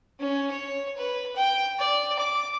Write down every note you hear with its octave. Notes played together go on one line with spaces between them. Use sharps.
C#4
C#5
B4
G5
D5
D6